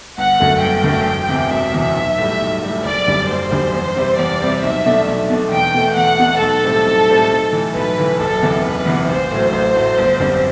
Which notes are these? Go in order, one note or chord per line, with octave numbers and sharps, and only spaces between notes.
G1 F#5
F#2 D3 F#3 A3
G1 G5
F#2 D3 F#3 A3
E1
E2 C3 E3
E1 E5
E2 C3 E3
B1
A2 G3
B1
A2 G3
F#1 D5
F#2 D3 G3
F#1 C5
F#2 D3 G3
E2
C3 G3 C4
E2 D5
C3 G3 C4
B1 E5
B2 A3 D4
B1
B2 A3 D4
E2 G5
B2 A3
E2 F#5
B2 A3
B1 A4
A2 G3 C4
B1
A2 G3 C4
B1
A2 E3
B1 B4
A2 E3
F#1 A4
E2 C3 E3 B3
F#1 B4
E2 C3 E3 B3
A1 C5
A2 F#3
A1 C5
A2 F#3
G1
F#2 D3 G3 C4